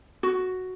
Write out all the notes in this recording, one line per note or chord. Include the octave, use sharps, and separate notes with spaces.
F#4